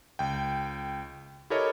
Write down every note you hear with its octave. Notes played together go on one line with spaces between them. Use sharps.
C#2 G5
E4 G4 A4 A#4 C#5 D#5